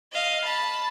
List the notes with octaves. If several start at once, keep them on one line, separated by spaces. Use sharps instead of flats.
D#5 F5
A5 B5